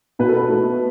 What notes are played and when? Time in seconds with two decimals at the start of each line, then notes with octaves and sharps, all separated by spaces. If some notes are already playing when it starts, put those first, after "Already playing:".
0.19 B2 B4
0.28 A4
0.36 B4
0.49 A3